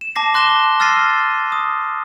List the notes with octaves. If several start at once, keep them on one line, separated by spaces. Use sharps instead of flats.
E7
A5 D6 A#6 C7
C6 F#6 A#6 E7 G7
E6 F6 A6 A#6 C7 D#7
D#6